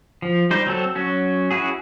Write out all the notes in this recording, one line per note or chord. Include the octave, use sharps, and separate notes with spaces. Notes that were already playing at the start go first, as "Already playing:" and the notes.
F3
G3 D#4 C5
F#3 C4 A4
F#3 C#4 F#4
C#4 E4 F#4 G#4